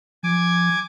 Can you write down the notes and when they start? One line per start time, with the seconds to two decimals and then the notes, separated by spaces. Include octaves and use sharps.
0.23 F3 G#5 D6 G#6